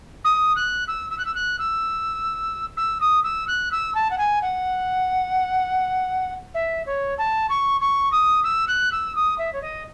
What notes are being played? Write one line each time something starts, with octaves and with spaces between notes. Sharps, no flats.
D#6
F#6
E6
E6
F#6
E6
F#6
E6
E6
D#6
E6
F#6
E6
A5
F#5
G#5
F#5
E5
C#5
A5
C#6
C#6
D#6
E6
F#6
E6
D#6
E5
C#5
D#5